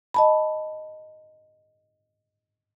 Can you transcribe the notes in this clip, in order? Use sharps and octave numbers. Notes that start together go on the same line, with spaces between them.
D#5 A5 B5